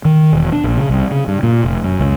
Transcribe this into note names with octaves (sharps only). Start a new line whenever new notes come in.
D#3
E1
D4
A#1
C#3
C2
C#3
G2
A#2
F1
F#2
C#2